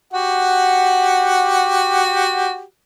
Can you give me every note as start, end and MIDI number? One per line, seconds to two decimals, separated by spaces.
0.14 2.61 66
0.14 2.61 67
0.14 2.61 78